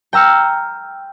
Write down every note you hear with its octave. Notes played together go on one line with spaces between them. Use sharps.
G5 A#5 E6 F6 C#7